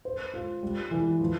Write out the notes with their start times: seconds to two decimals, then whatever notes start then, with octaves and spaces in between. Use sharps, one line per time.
0.05 C5
0.34 F4
0.63 G3
0.91 E3
1.21 F3